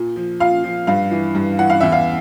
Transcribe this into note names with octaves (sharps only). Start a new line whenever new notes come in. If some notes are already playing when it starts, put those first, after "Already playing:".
Already playing: A#2
F3
A#2 F5
F3
G2 F5
E3
G2
E3 F#5
F5
E2 E5
F5